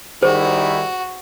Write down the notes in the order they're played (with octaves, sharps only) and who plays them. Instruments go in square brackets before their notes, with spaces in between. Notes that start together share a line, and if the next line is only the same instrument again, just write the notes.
[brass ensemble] D#3 G3 E4 [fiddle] F#4 [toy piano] G#4 C5